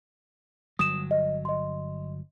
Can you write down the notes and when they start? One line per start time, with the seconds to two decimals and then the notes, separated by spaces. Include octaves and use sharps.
0.79 G1 F#3 D#6 E7
1.11 D#5
1.45 D#5 C6